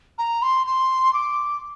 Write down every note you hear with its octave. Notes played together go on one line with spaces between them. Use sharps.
A#5
C6
C6
D6